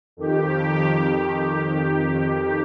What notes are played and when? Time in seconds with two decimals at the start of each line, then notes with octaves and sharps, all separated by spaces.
0.17 F2 D#3 G4